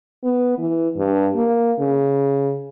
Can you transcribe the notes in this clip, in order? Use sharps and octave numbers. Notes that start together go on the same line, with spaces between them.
B3
E3
G2
A#3
C#3